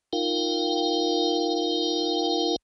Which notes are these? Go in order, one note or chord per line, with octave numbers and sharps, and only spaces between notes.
D#4 F4 A#4 F5 G5